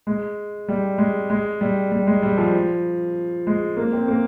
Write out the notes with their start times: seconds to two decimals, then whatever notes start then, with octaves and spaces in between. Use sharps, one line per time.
0.07 G#3
0.68 G3
0.98 G#3
1.30 G#3
1.61 G3
1.92 G3
2.07 G#3
2.22 G3
2.38 F3
3.47 G#3
3.77 A#3
3.93 C4
4.08 A#3